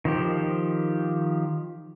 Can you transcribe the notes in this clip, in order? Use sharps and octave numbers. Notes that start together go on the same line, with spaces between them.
D#3 F3 G4